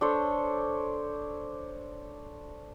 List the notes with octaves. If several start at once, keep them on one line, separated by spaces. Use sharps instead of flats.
D4 A4 C5 C#5